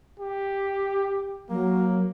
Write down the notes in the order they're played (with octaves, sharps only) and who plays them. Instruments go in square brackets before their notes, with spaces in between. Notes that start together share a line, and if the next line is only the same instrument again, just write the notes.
[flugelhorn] G4
[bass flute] F#3 [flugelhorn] A#3